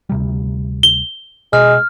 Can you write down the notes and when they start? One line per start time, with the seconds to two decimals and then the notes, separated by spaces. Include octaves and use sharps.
0.09 D2 C3 G3
0.83 G7
1.53 B2 G#3 F6